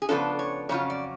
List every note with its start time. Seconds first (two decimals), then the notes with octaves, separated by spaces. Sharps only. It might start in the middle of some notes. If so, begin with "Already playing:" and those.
0.02 G#4
0.09 C#3 F3 B3 D4 F4 A4
0.39 C#5
0.69 F2 C#3 F#3 C#4 F4 C#5
0.90 D5